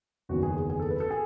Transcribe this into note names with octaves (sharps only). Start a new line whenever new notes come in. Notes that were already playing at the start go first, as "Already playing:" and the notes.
F#1 E2 D#3 F#4
G#4
G#4
G#4
A4
B4
A4
G#4